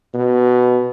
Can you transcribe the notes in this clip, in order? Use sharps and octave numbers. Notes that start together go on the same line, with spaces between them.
B2